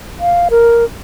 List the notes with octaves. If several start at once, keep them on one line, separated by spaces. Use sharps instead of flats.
F5
A#4